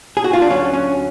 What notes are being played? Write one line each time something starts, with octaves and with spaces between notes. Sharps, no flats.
G#4
F#4
F4
D4
D2 D3 F#3 C#4
C#4